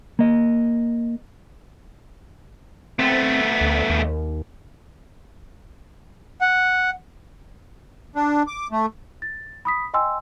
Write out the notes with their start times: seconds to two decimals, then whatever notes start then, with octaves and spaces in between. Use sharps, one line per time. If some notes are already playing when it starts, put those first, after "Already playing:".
0.19 A#3 D#5
2.99 A3 B3 C4
3.61 D2
3.90 D#2
6.41 F#5
8.15 D4
8.47 D6
8.71 A3
9.22 A6
9.65 B5 D#6 B6
9.94 D#5 G5 G#5 C6 E6